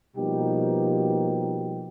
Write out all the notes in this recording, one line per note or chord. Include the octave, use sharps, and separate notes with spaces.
B2 F3 G3 A#3 D#4 G4